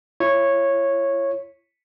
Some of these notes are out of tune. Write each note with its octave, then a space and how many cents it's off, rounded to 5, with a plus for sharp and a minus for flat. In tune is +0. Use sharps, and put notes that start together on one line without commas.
E4 +40 C#5 -10